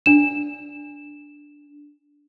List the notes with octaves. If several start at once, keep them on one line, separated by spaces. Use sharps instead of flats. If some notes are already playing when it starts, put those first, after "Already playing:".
D4 E7